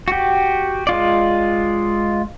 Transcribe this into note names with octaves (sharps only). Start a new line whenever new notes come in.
F#4 G4
G#3 F4 D5